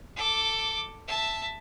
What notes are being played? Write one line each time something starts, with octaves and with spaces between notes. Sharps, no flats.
A4 D6
E5 A5